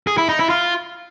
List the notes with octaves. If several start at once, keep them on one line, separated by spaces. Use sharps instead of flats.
G#4
E4
D#4
E4
F4